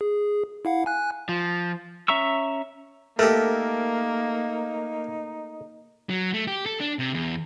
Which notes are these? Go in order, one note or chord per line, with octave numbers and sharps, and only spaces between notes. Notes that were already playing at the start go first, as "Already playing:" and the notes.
G#4
E4 F5 F#5
G#5 F#6
F3
C#4 E5 A#5 C#6 E6
A3 A#3 D#4 G4 A4 A#4
F#3
A3
G4
A4
D4
C3
E2